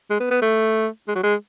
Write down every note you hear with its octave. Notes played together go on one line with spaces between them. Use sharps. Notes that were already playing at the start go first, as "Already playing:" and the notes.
G#3
B3
B3
A3
G#3
F#3
G#3